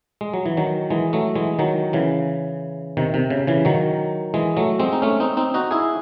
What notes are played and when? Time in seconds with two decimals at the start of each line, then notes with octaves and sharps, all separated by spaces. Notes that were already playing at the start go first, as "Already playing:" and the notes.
0.21 G#3
0.33 F#3
0.46 E3
0.57 D#3 F#3
0.90 E3 G#3
1.13 F#3 A3
1.35 E3 G#3
1.59 D#3 F#3
1.93 C#3 E3
2.97 C3 D#3
3.14 C3
3.30 C#3
3.47 C#3 E3
3.65 D#3 F#3
4.34 E3 G#3
4.57 F#3 A3
4.79 G#3 C4
4.92 D#4
5.02 A3 C#4
5.20 C4 D#4
5.37 C4 D#4
5.54 D#4 F#4
5.71 E4 G#4